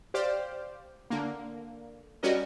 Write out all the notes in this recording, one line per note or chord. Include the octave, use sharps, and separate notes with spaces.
G4 C5 D5 F5
D3 A#3
G3 C#4 F#4 A#4 D#5